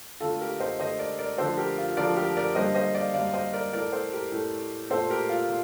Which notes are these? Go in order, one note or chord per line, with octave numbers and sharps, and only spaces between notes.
D3 A3 F4 A4
G4 A#4
C5 D#5
D3 A3 C5 D#5
A#4 D5
A#4 D5
D3 F3 A3 A4 C5
G4 A#4
F4
D3 F3 A3 A#4 D5
G4 A#4
A#4 D5
D3 G3 A#3 C5 D#5
C5 D#5
D5 F5
D3 G3 A#3 D5 F5
C5 D#5
A#4 D5
A2 A3 A#4 D5
A4 C5
G4 A#4
A2 A3
A#2 A3 A4 C5
G4 A#4
F4
A#2